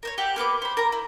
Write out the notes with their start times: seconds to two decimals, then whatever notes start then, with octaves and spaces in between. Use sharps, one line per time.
0.03 A#4 C5 C#5
0.18 G4 E5 F#5
0.36 A#3 B3 B4 D6
0.62 C5 B5
0.77 A#4 A#5
0.92 E4